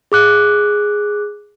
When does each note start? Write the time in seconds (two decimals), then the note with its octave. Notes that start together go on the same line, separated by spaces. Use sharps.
0.12 G#4 D6 F#6